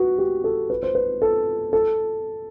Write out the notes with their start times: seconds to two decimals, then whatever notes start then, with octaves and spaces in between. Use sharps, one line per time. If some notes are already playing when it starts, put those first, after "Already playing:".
Already playing: F#4 B4
0.18 G4
0.44 A4
0.70 B4
0.83 C5
0.95 B4
1.22 A4
1.73 A4